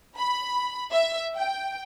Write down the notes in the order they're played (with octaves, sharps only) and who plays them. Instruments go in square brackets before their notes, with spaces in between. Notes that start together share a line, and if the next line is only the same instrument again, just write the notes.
[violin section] B5
E5
G5